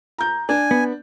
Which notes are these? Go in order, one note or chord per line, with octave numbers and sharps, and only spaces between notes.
A#5 G6
D4 G#5
B3